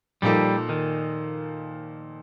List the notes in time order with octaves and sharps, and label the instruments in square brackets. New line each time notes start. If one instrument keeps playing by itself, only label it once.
[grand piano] A#2 F3 A#3 D#4 A4 [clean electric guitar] G3
[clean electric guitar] D#3